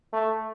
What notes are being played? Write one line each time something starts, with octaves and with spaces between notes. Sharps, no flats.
A3